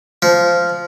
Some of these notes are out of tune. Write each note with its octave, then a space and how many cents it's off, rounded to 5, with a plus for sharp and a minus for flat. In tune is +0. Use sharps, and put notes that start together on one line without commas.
F3 -10